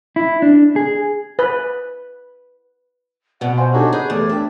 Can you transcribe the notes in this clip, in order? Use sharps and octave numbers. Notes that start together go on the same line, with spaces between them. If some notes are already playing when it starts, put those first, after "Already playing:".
E4
D4
G#4
B4
F2 B2 B4 D5 F#5
C5 F5 G#5 C6
D4 D#4 F#4 G4 A4 C#5 D5
G#4 B4 G6
E2 A3 G4 A4 D5
B3 D4 A#4 E5 G5